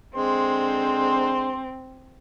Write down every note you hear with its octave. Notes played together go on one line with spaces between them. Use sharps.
D3 G#3 C4 C5